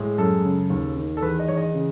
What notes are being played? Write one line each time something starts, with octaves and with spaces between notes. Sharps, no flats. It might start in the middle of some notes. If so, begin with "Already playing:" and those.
Already playing: A2 G#3
F#2 A4
C#3
D#2
D#3
A4
E2 B4
D#5
E2 C#5
D#5
C#3